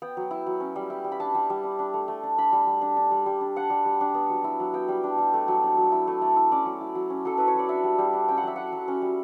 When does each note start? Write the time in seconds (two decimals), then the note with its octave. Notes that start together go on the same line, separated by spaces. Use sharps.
0.02 B3 G5
0.17 F#3
0.31 E4
0.47 F#3
0.60 C#4
0.76 G3
0.90 E4
1.04 G3
1.12 B5
1.20 D4 A5
1.35 G3
1.50 G3
1.64 D4
1.79 D4
1.94 A3
2.08 A3
2.23 D4
2.38 D4 B5
2.52 G3
2.67 G3
2.82 D4
2.97 D4
3.11 G3
3.26 G3
3.41 D4
3.56 D4 F#5
3.70 G3
3.85 G3
4.01 D4
4.15 B3
4.30 F#3
4.44 E4
4.60 F#3
4.73 B3 G5
4.88 G3
5.04 D4
5.18 G3
5.34 A3
5.48 F#3
5.63 D4
5.78 F#3
5.92 E4
6.07 A3
6.22 A3
6.36 E4
6.52 C#4 D5
6.65 F#3
6.81 E4
6.95 F#3
7.10 C#4
7.25 F#3 A4
7.38 E4 B4
7.48 C#5
7.54 F#3 D5
7.69 D4 E5
7.84 G3
7.98 G3
8.13 D4
8.28 C#4 G5
8.37 F#5
8.43 F#3 E5
8.56 E4 F#5
8.73 F#3
8.88 C#4
9.02 G3